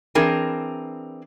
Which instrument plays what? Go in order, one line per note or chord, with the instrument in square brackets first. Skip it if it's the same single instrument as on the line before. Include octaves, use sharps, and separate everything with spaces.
[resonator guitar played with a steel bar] E3 C4 D4 G#4 A#4